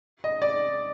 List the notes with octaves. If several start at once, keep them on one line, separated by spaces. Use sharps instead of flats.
D#5
D5